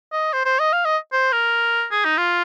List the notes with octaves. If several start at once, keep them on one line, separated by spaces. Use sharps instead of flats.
D#5
C5
C5
D#5
F5
D#5
C5
A#4
G#4
D#4
F4